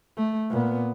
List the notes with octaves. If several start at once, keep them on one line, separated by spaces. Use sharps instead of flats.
A3
A#2 B3